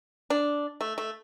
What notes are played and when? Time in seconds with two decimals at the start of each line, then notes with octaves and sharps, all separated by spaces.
0.30 D4
0.81 A3
0.98 A3